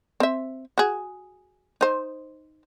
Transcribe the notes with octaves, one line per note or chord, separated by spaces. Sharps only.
C4 E5
F#4 G#4
D#4 C5